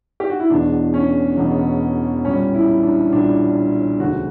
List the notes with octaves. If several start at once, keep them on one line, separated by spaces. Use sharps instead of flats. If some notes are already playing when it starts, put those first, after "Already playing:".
G4
F#4
E4
E1 E2 B2 D4
C#4
E1 E2 B2
B1 A#2 G3 C#4
E4
D4
B1 A#2 G3 D4
E1 D2 C#3 F#3 F#4